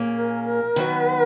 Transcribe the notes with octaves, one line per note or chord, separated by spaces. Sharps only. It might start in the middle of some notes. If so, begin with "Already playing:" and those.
Already playing: A#2 A#3 C#4 G#4
A#4
A#4
D#3 F#3 B3 F#4 B4